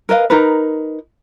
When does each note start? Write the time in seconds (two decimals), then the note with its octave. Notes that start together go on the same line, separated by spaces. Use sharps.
0.09 A#4 B4 D#5 F5
0.30 D#4 A#4 B4